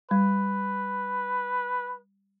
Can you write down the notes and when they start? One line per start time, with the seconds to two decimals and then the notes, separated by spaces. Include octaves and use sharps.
0.11 G3 B4